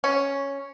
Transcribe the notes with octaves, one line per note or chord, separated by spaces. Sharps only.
C#4